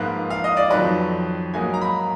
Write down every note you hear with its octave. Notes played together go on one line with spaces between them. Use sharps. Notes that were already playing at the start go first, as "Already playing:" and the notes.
Already playing: G#2 F3 A#3 F4 B4
F5
D#5
D5
F2 D#3 F#3 B4
G#2 F#3 A#3 D#4 G#5
A#5
B5